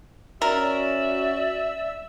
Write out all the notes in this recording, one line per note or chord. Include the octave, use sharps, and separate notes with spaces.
C#4 F#4 A#4 D5 E5